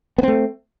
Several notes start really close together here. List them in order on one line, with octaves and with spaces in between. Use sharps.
B3 C4 A3